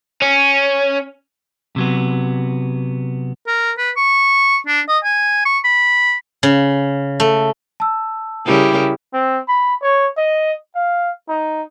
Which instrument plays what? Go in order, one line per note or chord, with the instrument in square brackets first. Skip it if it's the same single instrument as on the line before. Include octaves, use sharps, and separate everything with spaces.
[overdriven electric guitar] C#4
[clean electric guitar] C3 F#3 B3
[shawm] A#4
B4
C#6
D4
D#5
G#5
C#6
B5
[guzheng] C#3
A3
[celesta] A5 E6
[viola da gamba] C#3 G3 A#4 [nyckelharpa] E4 G4
[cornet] C4
B5
C#5
D#5
F5
D#4